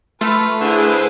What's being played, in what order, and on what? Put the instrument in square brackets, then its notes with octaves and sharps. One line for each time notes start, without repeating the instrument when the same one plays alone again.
[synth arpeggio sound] A3 [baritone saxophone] F4 [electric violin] B4 B5
[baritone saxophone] D3 [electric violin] E4 B4 [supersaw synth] G#4 C5